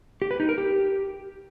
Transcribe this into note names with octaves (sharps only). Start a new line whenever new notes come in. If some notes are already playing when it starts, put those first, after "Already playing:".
G4
B4
D#4
A#4
G4